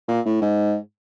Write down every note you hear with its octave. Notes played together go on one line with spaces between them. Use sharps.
A#2
A2
G#2